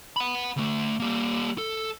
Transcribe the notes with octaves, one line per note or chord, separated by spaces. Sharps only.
F#5 B5
D2 A3
G3 A#3
A4